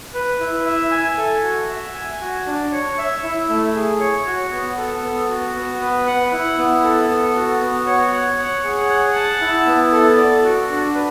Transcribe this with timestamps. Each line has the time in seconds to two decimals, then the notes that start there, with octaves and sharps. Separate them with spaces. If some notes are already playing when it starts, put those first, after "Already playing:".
0.14 B4
0.40 E4
0.66 E5
0.91 G#5
1.17 A4
1.43 F#4
1.69 E5
1.94 G#5
2.20 F#4
2.46 D4
2.71 C#5
2.98 E5
3.23 E4
3.49 A3
3.75 G#4
4.00 C#5
4.26 F#4
4.52 B3
4.78 A4
5.03 B3
5.29 F#4
5.55 B3
5.81 B4
6.06 F#5
6.32 E4
6.58 B3
6.84 A4
7.09 B3
7.35 F#4
7.61 B3
7.87 C#5
8.12 F#5
8.38 C#5
8.64 G#4
8.90 F#5
9.15 A5
9.41 E4
9.67 B3
9.92 A4
10.17 D5
10.44 F#4
10.69 D4
10.95 B4